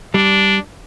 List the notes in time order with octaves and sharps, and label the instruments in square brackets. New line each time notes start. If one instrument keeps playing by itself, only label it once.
[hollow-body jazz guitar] G3 [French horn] D4